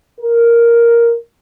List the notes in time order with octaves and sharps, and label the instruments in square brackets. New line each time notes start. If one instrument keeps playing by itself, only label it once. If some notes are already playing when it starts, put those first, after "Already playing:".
[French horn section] A#4